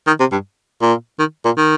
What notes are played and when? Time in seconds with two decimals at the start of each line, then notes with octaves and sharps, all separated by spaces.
0.07 D#3
0.20 C3
0.32 G2
0.82 A#2
1.19 D#3
1.45 A#2
1.57 D#3